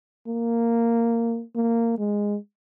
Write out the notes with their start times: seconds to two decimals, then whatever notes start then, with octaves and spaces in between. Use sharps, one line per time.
0.27 A#3
1.55 A#3
1.98 G#3